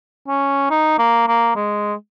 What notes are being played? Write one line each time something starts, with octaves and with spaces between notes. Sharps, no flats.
C#4
D#4
A#3
A#3
G#3